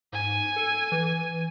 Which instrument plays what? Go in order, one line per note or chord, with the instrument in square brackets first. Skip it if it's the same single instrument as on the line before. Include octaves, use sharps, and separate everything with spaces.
[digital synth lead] G#2 [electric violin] G#5
[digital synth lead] A4
E3